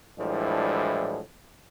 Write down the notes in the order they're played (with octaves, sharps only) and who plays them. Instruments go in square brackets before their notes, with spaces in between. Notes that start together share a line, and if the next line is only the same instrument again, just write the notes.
[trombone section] A2 E3 F3 G3 G#3 D4